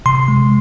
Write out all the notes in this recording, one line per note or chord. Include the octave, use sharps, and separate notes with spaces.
C3 C6
G#3